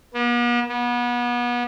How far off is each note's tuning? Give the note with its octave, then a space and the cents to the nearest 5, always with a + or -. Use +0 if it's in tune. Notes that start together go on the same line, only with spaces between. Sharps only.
B3 -45
B3 -30